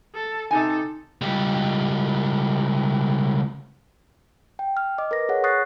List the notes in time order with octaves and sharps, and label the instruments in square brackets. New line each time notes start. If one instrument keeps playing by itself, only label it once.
[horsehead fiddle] A4
[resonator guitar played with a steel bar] C3 G#5 [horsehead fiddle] D#4 A4
[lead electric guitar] C#2 G3
[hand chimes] G5
F6
D#5 D6
A#4 B4 A#6
G#4 C#5 F#5
C#6 D#6 F#6 A6 A#6 C7